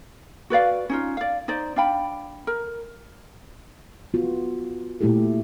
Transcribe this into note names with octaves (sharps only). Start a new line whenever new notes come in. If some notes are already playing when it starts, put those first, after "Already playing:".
F#4 B4 D5 F5
C#4 D#4 F4
D5 F5
D#4 C5 D5
D4 F5 G5 B5
A#4
B3 F4 F#4
A#2 A3 E4 G4 A4